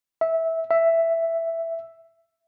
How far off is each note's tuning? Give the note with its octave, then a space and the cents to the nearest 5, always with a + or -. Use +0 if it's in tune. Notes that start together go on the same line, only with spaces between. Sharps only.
E5 -15
E5 +5